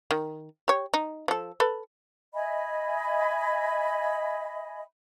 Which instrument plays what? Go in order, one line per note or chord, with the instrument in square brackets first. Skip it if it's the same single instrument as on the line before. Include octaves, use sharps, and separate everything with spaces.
[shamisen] D#3
G4 C#5
D#4
F3 A4
A4 B4
[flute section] D#5 E5 G#5 B5